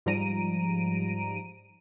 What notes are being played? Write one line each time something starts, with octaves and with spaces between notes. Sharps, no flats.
G#2 F3 G3 A#5 D7 D#7